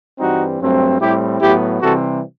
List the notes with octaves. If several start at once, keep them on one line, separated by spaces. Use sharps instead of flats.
G2 E3 G3 C4 D#4 F#4
G2 F#3 A3 C4
A2 G3 C4 E4 G4
A2 F#3 B3 E4 G4
C3 E3 G3 C4 F#4 A4